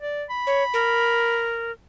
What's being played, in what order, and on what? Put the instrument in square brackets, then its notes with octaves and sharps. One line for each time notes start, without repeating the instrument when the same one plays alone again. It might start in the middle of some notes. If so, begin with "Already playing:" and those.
[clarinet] D5
B5
[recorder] C#5
A#4